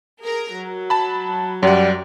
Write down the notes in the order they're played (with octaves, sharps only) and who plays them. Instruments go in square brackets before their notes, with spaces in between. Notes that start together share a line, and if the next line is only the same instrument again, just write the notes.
[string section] G#4 A#4 A#5
F#3
[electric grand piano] A5 B5
[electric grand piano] F#2 F#5 [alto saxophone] G3